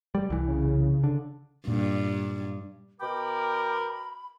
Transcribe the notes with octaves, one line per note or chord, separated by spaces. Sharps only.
G3
C2 E3
C#3
D3
G2 A#2
B2 A#4 G5 B5 D6